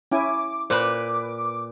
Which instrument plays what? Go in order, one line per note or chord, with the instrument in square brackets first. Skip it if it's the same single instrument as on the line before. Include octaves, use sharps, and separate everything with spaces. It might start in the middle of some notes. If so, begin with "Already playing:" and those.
[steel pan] C#4 E4 G#5 [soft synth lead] D6
[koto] A#2 B4 [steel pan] C5 [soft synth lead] D6